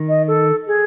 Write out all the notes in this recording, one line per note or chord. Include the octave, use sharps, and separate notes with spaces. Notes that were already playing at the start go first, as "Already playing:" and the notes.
Already playing: D#3
D#5
A4
G#4